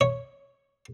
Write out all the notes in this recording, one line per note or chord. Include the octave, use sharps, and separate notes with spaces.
C#5